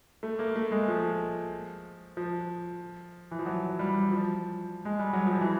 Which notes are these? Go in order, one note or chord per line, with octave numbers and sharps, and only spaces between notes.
A3
A#3
A3
G#3
F3
F3
E3
F3
F#3
G3
F3
G#3
G3
F#3
F3
E3